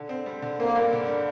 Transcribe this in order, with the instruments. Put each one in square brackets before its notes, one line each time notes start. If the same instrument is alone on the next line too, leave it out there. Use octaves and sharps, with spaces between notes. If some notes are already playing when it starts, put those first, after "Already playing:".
Already playing: [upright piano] D3
C4
G3
D3
[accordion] A#3 [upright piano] C4
[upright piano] G2
D3
G3